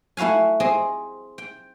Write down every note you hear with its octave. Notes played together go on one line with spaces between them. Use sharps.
A3 E4 F#4 F5 G#5
C4 G#4 D#5
G5